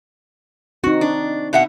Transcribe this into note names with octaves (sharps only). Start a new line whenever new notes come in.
C4 D#4 F#4
D4
B2 E5 F#5